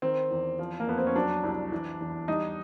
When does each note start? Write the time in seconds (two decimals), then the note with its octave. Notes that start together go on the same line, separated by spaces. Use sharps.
0.02 D#3 C4
0.31 E2
0.59 F3
0.80 A#3
0.87 F2 B3
0.98 C4
1.07 C#4
1.15 F#3 D4
1.43 C2
1.72 E3
2.01 E2
2.28 G3 D#4